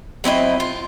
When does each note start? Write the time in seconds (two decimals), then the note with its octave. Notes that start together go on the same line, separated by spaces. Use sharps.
0.24 F#3 C4 E4 D#5
0.60 F4